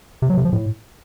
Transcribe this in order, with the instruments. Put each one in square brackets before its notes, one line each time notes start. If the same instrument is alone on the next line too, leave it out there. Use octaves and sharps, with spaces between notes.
[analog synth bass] C3
F#3
C3
F3
A2